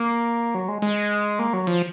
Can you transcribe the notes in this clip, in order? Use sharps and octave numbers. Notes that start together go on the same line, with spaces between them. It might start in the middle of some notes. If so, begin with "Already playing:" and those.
Already playing: A#3
F#3
G#3
G#3
A#3
F#3
F3